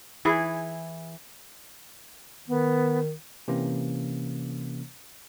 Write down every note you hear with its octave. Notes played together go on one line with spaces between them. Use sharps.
E3 E4 G#4
D#3 B3
C3 E3 A#3 C#4